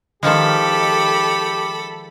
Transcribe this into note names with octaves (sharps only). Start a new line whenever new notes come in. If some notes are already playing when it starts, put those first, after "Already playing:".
D#3 F3 G#3 G4 A4 B5